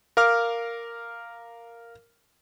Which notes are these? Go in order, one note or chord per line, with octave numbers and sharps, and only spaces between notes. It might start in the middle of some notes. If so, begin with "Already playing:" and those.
A#4 F5 D6 F6